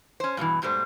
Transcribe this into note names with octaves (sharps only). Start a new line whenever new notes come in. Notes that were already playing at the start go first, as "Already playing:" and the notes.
C#4 C5
G2 B2 D#3 E3
G#2 B2 G3 A3 C5